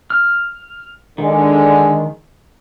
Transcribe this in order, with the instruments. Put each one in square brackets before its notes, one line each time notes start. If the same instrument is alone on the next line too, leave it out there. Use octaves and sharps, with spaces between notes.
[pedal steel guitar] F6
[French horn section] D3 G#3 [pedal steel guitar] D#3